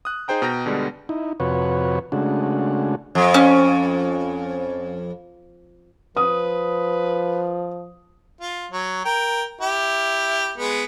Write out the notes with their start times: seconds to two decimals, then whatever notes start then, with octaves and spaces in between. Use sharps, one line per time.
0.05 D#6 F#6
0.28 D#4 G#4 C5 G5 A#5
0.42 B2 G5 A#5 G6 A#6
0.66 B2 D3 G3 G#3
1.09 D#4 E4
1.40 F2 C3 F#4 B4 C#5
2.12 C#3 G#3 A3 D4 F#4
3.15 F2
3.34 C#4
6.17 F3 B4 D#6
8.41 F4
8.72 F#3
9.05 A#4 G5
9.61 E4 G4
10.58 G#3 B3